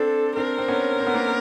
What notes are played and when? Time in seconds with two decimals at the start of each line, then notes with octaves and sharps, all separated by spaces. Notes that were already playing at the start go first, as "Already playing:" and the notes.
Already playing: C4 D4 A4
0.37 C4 D4 A#4
0.58 C4
0.68 B3 C#4
1.00 C4
1.07 B3
1.14 A#3 C4